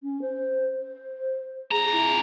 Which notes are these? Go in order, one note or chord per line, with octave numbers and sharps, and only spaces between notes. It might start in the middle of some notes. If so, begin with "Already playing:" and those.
C#4
C5
C5
F2 G#4 A#5
E4